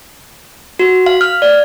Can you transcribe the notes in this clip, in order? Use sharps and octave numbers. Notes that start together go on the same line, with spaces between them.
F#4
F5
F6
D5